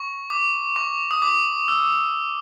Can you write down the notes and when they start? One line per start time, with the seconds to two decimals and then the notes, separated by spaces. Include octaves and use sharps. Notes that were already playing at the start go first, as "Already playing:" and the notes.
Already playing: C#6
0.30 D6
0.76 C#6
1.11 D#6
1.22 D6
1.68 E6